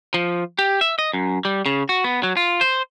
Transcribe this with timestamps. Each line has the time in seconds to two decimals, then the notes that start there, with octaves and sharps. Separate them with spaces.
0.14 F3
0.59 G4
0.81 E5
0.99 D#5
1.13 F#2
1.45 G3
1.66 C#3
1.89 F#4
2.04 B3
2.23 F#3
2.37 F4
2.61 C5